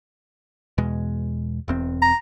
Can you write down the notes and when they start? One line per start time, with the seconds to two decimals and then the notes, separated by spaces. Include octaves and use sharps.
0.78 E2 B2 G#3
1.68 E1 E2 C4
2.02 A#5